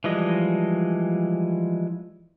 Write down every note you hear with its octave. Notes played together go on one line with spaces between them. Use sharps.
E3 F3 G3 G#3 D#5